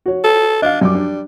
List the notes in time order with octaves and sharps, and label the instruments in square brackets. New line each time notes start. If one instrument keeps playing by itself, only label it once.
[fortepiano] F#4 C#5
[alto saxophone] A4
[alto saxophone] D4 [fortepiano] D#5 F5
[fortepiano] F#2 D6 [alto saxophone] G3
[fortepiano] D4